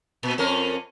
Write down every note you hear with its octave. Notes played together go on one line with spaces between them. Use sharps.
A#2
F2 C#4 A#4